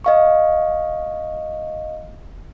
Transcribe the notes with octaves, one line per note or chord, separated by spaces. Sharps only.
D#5 F5 C#6